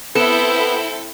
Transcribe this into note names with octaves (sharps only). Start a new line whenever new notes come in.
B3 C4 E4 A4 G6